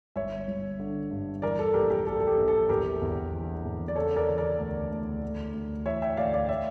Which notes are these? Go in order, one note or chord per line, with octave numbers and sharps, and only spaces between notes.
G1 C#5 E5
G1
D3
G2
E3 A#4 D5
A4
A#1 G4 A#4
G4 A#4
A#1 A4
A4
G4
A#1
A4
E2 G4 A#4
E2
E3
E2
D5
C#3 A4 C#5
A#4 D5
E3
A#4 D5
D2
D2
D2
D2
E3 C#5 E5
E5 G5
D2 D5 F5
D5 F5
C#5 E5